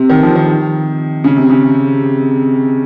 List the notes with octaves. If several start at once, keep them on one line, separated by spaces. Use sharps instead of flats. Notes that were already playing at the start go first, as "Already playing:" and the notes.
Already playing: C3
D#3
F3
D#3
C#3
C3
C#3